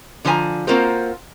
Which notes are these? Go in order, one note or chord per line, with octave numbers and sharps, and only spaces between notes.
D3 F3 A4 C5 G#5 A#5
A#3 C4 F4 F#4 A#4 C5